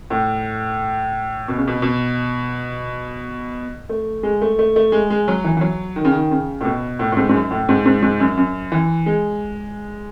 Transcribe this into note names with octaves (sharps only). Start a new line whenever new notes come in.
A2
B2
C#3
B2
B2
A3
G#3
A3
A3
A3
G#3
G#3
F#3
E3
E3
F#3
D#3
C#3
D#3
C#3
A2
B2
A2
A2
G#2
G#2
F#2
A2
G#2
G#2
G#2
F#2
F#2
E3
G#3